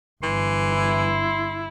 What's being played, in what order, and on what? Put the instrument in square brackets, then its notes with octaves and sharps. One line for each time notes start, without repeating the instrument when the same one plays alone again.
[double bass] G1 [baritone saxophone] E3 [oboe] C6
[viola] E4